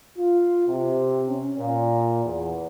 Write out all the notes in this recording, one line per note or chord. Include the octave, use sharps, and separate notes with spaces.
F4
C3
C#4
A#2
E2